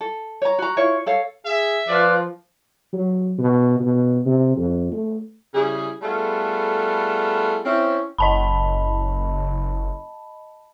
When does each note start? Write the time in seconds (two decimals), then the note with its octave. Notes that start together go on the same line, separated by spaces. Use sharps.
0.01 A4
0.42 C#5 A#5
0.58 F#4 A#5
0.77 E4 F4 C#5
1.06 A4 C#5 F5
1.46 G#4 E5
1.88 F3 F4 B4 D5
2.93 F#3
3.38 B2
3.80 B2
4.25 C3
4.56 F2
4.92 A3
5.55 C#3 G3 E4 G#4
6.02 G3 A3 B3 F4 G#4 A4
7.65 C4 C#4 E4
8.18 F#1 D#5 A5 B5